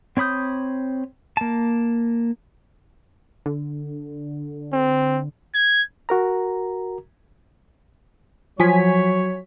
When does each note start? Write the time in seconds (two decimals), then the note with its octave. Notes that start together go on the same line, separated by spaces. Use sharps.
0.17 C4 C#5 B5 D#6 G6
1.37 A#3 A5
3.46 D3
4.72 C4
5.55 G#6
6.09 F#4 A#4 A#5
8.60 F3 F#3 C#5 G#5 B6